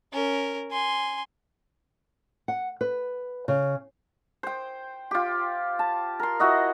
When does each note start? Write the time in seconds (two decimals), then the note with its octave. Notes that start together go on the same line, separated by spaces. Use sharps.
0.13 C#4 A#4
0.71 G#5 C6
2.48 F#5
2.81 B4
3.48 C#3
4.43 C5 G5
5.11 F4 G4
5.79 A5
6.20 A#4 C6
6.40 E4 F#4 D#5